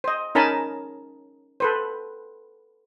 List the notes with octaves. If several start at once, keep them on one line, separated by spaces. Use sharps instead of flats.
C5 D#5
C#4 D#4 A#4 G#5 A5 B5
A4 B4 C5